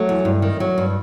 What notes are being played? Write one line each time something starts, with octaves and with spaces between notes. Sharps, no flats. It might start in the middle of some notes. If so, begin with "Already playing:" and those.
Already playing: F#3 A3
E2
G2
D#3
F#3
G2